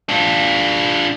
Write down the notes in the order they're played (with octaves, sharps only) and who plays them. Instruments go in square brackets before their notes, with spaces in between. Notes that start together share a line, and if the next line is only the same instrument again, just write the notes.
[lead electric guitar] D4 F4